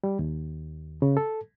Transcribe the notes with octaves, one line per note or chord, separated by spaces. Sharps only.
G3
D#2
C#3
A4